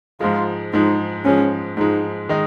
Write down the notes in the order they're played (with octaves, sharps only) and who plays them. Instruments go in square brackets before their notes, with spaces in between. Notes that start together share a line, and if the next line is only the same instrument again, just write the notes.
[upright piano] G#2 F3 G#3 [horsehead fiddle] F4
[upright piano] G#2 F3 G#3 [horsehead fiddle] D#4
[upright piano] G#2 F3 G#3 [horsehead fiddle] C#4
[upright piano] G#2 F3 G#3 [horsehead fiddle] D#4
[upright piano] D#3 G#3 D#4